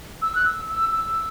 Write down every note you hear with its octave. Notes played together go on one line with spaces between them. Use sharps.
E6
F#6
E6
E6
E6